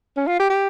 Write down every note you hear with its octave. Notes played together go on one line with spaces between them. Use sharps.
C#4
F4
G4
G4